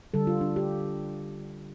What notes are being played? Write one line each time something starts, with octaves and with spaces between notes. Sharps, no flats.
D3 G3 A4
F4
D4
G4